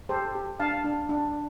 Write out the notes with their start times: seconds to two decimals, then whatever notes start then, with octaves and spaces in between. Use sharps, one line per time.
0.09 G4 A4 C5
0.35 G4
0.60 D4 F5 A5
0.84 D4
1.09 D4